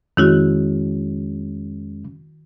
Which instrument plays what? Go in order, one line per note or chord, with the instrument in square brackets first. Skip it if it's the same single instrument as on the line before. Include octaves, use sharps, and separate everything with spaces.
[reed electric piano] F2 G#3 C#4 [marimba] D#3 E4 F#4